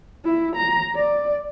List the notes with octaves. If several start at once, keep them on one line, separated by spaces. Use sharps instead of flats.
E4
A#5
D5